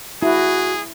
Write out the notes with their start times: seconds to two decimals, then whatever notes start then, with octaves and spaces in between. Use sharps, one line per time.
0.22 E4 F#4 G#4